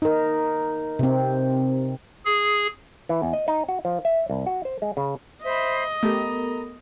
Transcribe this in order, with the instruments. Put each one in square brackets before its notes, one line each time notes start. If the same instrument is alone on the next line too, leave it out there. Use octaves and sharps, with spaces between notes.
[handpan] D#4 A#4
C3 C4
[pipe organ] G#4
[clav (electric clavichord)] E3
E2
D#5
D#4
F#4
F3
E5
C2
F#4
C5
G#3
C#3
[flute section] C5 E5 B5 [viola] D#5
[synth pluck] A3 G4 [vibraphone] B3 A4 A#4 [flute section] A#5